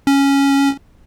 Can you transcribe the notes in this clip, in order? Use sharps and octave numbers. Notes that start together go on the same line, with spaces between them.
C#4